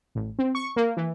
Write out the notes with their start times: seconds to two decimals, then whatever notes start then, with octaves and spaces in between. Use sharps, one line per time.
0.15 A1
0.39 C4
0.55 C#6
0.76 A#3
0.97 E3